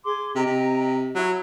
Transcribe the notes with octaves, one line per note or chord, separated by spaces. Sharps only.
G#4 C6 D6
C3 D#5 G5 A#5
C3
F#3 E4